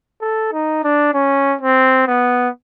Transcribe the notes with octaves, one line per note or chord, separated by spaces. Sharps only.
A4
D#4
D4
C#4
C4
B3